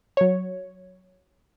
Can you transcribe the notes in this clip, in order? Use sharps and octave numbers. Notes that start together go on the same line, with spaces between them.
F#3 C#5